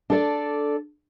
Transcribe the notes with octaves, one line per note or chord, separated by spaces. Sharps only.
D4 A4 D5